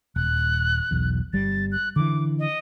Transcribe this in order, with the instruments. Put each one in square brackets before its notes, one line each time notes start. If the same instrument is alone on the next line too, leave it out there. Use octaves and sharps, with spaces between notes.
[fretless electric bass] D#1 [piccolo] F#6
[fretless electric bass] B1 E2
[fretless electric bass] G1 G3 [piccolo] A6
[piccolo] F#6
[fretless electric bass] D3 E3 [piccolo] D6
[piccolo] D#5